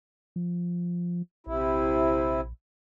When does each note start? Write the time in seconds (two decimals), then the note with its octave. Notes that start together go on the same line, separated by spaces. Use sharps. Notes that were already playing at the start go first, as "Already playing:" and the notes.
0.36 F3
1.47 A#1 C3 E4